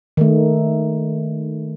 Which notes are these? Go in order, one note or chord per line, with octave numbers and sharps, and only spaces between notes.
D#3 A3